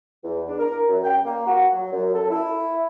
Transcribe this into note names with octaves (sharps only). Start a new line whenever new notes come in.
E2
D4
A#4
F#2
G5
A#3
F#4
F#3
F#2
A4
E4